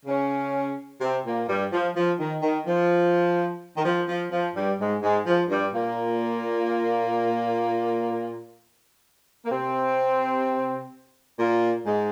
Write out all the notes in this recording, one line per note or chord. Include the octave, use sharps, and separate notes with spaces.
C#3 C#4
C3 C4
A#2 A#3
G2 G3
F3
F3
D#3
D#3
F3
D#3
F3
F3
F3
G2 G3
G#2 G#3
G#2 G#3
F3
G2 G3
A#2 A#3
A#3
C3 C4
A#2 A#3
G#2 G#3